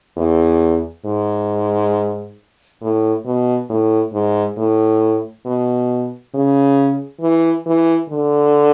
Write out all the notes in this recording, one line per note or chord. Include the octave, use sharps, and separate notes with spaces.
E2
G#2
A2
B2
A2
G#2
A2
B2
C#3
E3
E3
D3